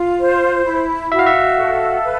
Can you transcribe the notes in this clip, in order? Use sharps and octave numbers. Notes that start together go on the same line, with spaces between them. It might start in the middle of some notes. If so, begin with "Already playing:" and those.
Already playing: F4
C5
E4
F#4 E5
F5
E5
A4
B4